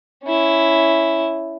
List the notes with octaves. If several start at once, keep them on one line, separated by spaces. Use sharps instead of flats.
C#4 E4